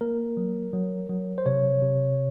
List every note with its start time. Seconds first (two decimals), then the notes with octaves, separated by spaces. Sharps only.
0.01 A#3 A#4
0.37 F#3
0.73 F#3
1.10 F#3
1.38 C5
1.46 C3 C#5
1.82 C3